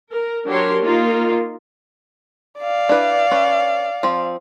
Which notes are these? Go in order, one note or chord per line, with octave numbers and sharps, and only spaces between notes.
A#4
F#3 D4 G4 A#4 C#5 C6
A#3 D#4 F4 A#4
D5 F5
D4 E4 B4
C#4 B4
F3 C4